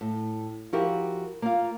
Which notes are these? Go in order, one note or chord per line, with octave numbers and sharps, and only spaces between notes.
A2
F3 E4 F#4 G4 A#4
A#3 F4